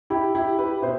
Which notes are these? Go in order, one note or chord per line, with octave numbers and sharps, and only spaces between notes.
E4 G4
E4 G4
G4 B4
B2 C5 E5